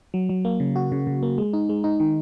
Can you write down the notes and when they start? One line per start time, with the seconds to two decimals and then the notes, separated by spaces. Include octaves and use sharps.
0.14 F#3
0.29 F#3
0.45 A#3
0.60 C#3
0.76 F#4
0.92 C#3
1.07 C#3
1.23 A#3
1.38 G#3
1.53 D#4
1.69 G#3
1.84 D#4
2.00 D#3